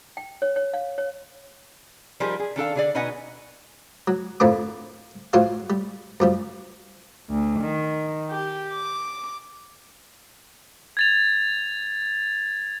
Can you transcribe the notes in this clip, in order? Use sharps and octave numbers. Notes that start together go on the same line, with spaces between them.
G5
C#5
C#5
F5
C#5
F3 G3 D#4 G#4 A#4 C5
G#4
D#3 D4 A4 F5
D3 G#4 D5
B2 D#4 B4 D#5 F#5 G#5
F#3
F2 A2 F3 A#3 D4 D6
A1 F3 F4 F#4 C#5 F5
G3
F#2 F3 G3
D2
D#3
G4
D6
G#6 A6 F7